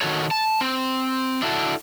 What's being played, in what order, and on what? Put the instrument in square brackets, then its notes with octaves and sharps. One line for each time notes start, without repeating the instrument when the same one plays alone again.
[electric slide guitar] D#3 F#4 A4 C#5
A5
C4
D4 E4 F#4 A4